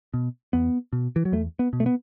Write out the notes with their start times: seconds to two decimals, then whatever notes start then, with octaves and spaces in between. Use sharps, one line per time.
0.14 B2
0.53 E2 B3
0.93 B2
1.16 E3
1.25 F#3
1.32 E2 A3
1.59 B3
1.73 B2
1.80 A3
1.86 B3